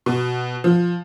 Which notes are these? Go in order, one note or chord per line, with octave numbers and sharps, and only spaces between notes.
B2
F3